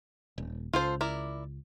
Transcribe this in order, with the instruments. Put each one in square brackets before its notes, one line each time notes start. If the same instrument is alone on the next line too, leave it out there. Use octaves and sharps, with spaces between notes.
[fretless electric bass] D#1
[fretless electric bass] C#2 [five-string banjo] F4 A4 C5
[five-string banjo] E4 A#4 D5